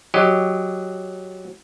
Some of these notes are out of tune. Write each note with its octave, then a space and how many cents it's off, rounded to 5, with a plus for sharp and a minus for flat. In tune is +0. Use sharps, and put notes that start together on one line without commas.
F#3 +0 G4 +0 D#5 +5